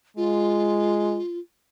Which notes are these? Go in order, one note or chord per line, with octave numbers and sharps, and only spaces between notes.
G#3 F4